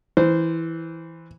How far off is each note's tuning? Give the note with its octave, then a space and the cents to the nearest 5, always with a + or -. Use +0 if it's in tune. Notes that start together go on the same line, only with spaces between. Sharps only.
E3 -5 C5 -15